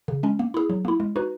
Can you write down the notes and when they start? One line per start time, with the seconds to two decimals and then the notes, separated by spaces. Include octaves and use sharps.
0.08 C#3
0.23 G#3 C#4
0.39 A#3
0.54 E4 G#4
0.70 F#3
0.85 A#3 E4
1.00 G#3
1.16 D#4 F#4 B4